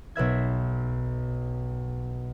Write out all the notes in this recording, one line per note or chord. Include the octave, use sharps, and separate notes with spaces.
B1 B4 E5 G#6